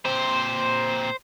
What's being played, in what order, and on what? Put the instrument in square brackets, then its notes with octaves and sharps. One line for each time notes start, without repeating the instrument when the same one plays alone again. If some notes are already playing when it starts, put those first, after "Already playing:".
[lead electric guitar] A#2 C4 [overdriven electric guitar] C5